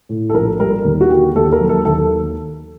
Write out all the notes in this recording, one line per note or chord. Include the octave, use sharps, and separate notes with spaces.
A2
A4
A#1 A#4
G3 A#4
D#2
F#4
D3 G4
D#2 A4
A#4
F#3
A4
D#2 A4